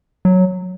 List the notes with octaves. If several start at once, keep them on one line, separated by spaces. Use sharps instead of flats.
F#3